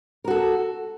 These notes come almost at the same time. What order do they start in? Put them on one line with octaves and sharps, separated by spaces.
A#4 F#4 A4